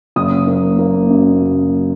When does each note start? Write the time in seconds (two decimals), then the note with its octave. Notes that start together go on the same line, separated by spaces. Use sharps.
0.16 F#1 D#6
0.47 A#3
0.79 A#3
1.10 F#2
1.42 F#1